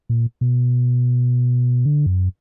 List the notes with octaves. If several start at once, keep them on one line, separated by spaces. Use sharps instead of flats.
A#2
B2
D3
F#2